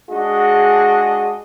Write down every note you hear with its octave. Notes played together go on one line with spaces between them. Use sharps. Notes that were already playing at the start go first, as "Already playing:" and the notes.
G#3 D4 F#4 G#4 D#5